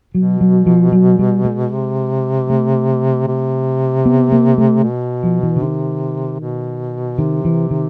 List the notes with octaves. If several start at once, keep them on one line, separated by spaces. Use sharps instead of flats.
B2 F#3
F#3
F3
F#3
G3
G#3
C3
A3
C3
B3
A#3
A3
B2
F3
E3
D3
C3 D#3
B2
C3 D#3
E3
D#3